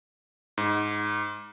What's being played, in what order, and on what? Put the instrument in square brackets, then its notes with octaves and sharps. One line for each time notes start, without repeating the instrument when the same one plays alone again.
[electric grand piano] G#2